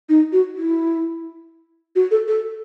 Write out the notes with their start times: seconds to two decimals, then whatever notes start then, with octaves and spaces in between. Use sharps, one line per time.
0.09 D#4
0.32 F#4
0.56 E4
1.95 F#4
2.11 A4
2.27 A4